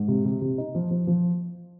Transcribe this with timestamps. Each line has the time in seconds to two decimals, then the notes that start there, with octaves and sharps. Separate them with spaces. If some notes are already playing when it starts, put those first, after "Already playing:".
Already playing: G#2
0.08 C3
0.25 C3
0.42 C3
0.58 D#4
0.75 F3
0.91 F3
1.07 F3